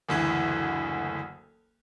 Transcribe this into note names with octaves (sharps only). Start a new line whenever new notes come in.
F#1 D2 E3